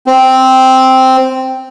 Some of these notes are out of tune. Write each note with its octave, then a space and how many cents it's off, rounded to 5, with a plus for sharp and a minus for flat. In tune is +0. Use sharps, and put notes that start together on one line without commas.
C4 -5